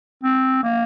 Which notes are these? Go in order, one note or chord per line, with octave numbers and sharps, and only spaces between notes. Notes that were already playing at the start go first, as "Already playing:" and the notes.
C4
A#3